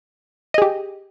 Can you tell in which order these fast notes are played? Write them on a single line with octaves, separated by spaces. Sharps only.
D#5 G#4 G4